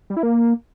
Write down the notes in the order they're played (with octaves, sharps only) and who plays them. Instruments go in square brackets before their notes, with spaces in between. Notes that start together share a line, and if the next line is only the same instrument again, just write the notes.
[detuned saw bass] G3
E4
A#3